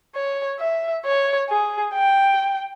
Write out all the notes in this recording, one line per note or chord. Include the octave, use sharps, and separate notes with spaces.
C#5
E5
C#5
G#4
G5